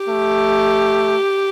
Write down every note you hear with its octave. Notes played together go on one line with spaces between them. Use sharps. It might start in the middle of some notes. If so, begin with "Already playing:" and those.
Already playing: G4
A3